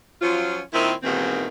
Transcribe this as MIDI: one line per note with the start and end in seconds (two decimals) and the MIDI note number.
0.21 0.60 53
0.21 0.60 54
0.21 0.60 61
0.21 0.60 65
0.73 0.93 46
0.73 0.93 51
0.73 0.93 60
0.73 0.93 64
1.03 1.48 39
1.03 1.48 44
1.03 1.48 47
1.03 1.48 51
1.03 1.48 52
1.03 1.48 60